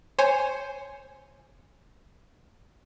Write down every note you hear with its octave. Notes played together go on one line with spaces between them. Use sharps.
C5 C#5 G#5